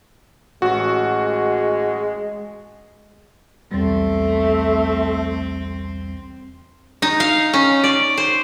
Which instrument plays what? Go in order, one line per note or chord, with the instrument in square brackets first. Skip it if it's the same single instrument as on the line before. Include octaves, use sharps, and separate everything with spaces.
[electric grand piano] A1 F#4 [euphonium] G#3
[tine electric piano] B1 E2 G3 [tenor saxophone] A3 [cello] C4
[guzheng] D#4
F5
C#4
D5
C5